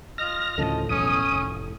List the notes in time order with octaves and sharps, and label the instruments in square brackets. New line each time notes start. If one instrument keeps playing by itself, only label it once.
[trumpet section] F4 D#5 [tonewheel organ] F6 A#6
[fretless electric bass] D2 C#3 F3 [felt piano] A2 A3 [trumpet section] D#5 A5
[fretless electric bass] D#1 B1 E2 [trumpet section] C#4 [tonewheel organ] D#6
[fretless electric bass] F1